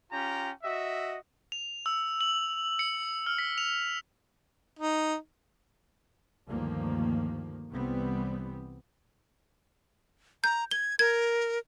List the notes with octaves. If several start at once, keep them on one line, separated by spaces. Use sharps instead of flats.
C#4 F4 G4 G5 A#5
F#4 D#5 E5
F7
E6
F#7
C#7
F6
B6
F7
D#4
D2 G2 D#3 F3 A#3
C2 C3 E3 G3 B3 C4
A#5 G6
G#6 G7
A#4 G#6